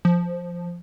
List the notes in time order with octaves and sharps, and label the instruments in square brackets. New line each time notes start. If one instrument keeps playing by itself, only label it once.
[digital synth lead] F3